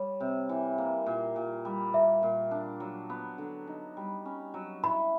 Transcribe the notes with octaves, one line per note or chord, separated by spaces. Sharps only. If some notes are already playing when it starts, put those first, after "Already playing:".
Already playing: G3 C#5
C3
E3
A#3
A#2
A#2
G3
A#3 E5
A#2
D4
F#3
B3
D3
D#4
G3
C#4
F#3
E4 B5